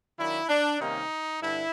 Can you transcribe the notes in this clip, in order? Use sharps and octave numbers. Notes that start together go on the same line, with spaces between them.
D#3 F#3 A#3 D4 E4
D4
C3 D#3 G3 A#3 C#4 D#4
G2 D3 E4